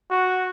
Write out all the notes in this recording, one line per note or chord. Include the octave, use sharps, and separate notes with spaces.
F#4